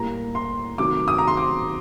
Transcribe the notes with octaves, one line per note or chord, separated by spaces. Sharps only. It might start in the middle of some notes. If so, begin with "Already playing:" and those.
Already playing: A2 G3 A#3 A#5
C6
C3 D#3 F#3 A3 D6
D#6
A#5
C6
D6